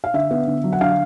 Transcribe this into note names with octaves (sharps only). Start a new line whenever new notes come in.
F5
D3 E5
B3
D3
F#3
F#5
D3 F5